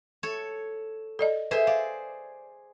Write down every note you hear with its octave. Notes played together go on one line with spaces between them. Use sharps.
A4 C#5
A4 D5 D#5
G#4 A4 B4 C5 E5
D5 F5